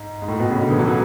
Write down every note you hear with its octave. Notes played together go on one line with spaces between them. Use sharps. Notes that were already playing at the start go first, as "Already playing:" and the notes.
Already playing: G#2
G#2
A2
B2
C#3
D3
E3
F#3
E3